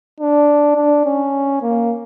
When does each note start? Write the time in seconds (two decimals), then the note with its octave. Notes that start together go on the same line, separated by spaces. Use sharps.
0.20 D4
0.76 D4
1.05 C#4
1.62 A#3